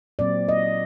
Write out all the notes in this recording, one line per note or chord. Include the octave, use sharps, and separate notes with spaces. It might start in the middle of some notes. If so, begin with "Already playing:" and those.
A#2 F#3 C4 D5
D#5